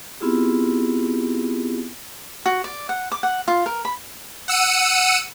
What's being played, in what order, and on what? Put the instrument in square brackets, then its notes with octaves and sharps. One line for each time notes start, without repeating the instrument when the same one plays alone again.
[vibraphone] B3 C4 E4 F4 G4 G#4
[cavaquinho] F#4
D5
F#5
D6
F#5
F4
A#4
B5
[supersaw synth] F#5 E6 C#7 D#7